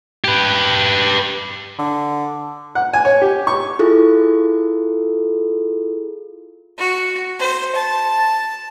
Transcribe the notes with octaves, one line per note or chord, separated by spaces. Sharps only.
G4 B4
D3
F#5
G#5
C#5
G4
C#6
E4 F4 G#4 A4
F#4
C5
A5